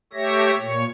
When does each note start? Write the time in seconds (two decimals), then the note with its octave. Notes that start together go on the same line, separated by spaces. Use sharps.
0.13 A3 G4 C#5 E5 A#6
0.57 A#2 C#5